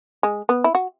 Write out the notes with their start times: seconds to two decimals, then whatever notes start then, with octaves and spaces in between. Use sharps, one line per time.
0.23 G#3
0.49 B3
0.64 E4
0.75 F#4